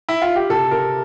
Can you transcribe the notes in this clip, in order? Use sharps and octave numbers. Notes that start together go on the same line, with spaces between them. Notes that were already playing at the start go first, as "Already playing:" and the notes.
E4
F4
G4
C3 A4
C3 A#4